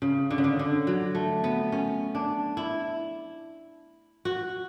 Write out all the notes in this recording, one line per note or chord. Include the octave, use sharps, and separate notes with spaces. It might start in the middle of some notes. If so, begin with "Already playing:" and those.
C#3
D3
C#3
D3
D3
F#3
A3
B3
C#4
D4
E4
F#4